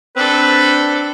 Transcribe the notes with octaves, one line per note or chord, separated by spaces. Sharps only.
C4 D4 A4 B4